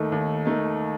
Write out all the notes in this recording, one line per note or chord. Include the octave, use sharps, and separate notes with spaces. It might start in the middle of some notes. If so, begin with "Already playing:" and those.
Already playing: D#2 D#3 A3 D#4
D#2
D#3 A3 D#4